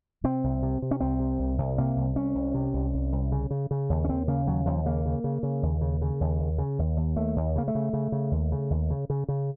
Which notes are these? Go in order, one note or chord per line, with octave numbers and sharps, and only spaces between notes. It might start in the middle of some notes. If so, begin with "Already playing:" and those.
C3 C4
C2
C3
C3
C#4
C2 C4
C3
C2
C2
C3 A#3
C2
C2 C#4
C2
C3
C2
C2
C2
C#3
C#3
C#3
D#2
C#4
D#2 C4
C#3 A#3
D#2 F#3
D#2 F3
C#3 A#3
C#3
C#3
C#3
D#2
C#3
C#3
D#2
D#2
C#3
D#2
D#2
D#2 A3
D#2
C#3 A#3
A3
C#3
C#3
C#3
D#2
C#3
D#2
C#3
C#3
C#3